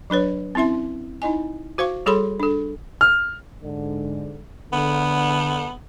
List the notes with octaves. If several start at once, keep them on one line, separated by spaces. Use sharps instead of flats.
F#3 D4 B4 C#5
C4 C#4 E4 E5 C6
D#4 E4 D#5 G#5
F#4 C5 F5 C#6
G3 G#4 A4 C#5 B5 C6
D4 A4
F6
G#2 D3
D3 B3